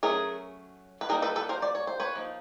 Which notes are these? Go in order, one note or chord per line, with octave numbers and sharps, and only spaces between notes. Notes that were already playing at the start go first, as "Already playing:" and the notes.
F#3 A3 C#4 G#4 A#4
B4
G3 A#3 D#4 G#4 A#4
A4 B4
A4 B4
A#4 C5
D5
C#5
C5
B4 C#5
F3 A#3 D#4